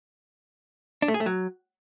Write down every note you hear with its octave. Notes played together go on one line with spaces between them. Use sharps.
D4
A3
G#4
A3
F#3